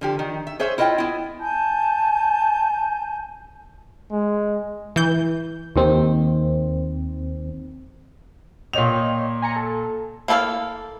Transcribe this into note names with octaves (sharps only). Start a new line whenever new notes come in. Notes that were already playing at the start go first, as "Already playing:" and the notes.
D3 F3 G4
D#3
E5
G#4 C5 C#5 E5
E4 F4 D#5 F#5 G5
B3 E4
G#5 A5 G6
G#3
E3 G6
D#2 D#3 C4
A#2 C#5 D#5 G5 F7
G#5 A#5 C#7
A4
A#3 E4 A4 C5 F5